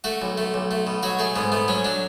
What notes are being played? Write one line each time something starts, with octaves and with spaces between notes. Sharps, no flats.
A3 F#4
B1
A3
B1
A3
B2
F#3 F#4
A3 G#4
G#2 B3
A3 B3
F#3 C#4
F#3 D4